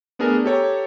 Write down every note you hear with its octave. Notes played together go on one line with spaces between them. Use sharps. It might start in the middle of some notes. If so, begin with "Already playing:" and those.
A3 B3 D4 G#4 A#4
G4 A4 C#5 A#5